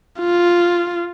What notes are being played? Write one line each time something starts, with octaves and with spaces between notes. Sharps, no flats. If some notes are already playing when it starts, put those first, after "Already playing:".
F4